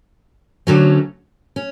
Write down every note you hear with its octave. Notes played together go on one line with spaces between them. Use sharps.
D2 D3 F#3 A3 C#4
C#4